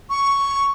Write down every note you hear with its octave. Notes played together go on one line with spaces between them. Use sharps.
C#6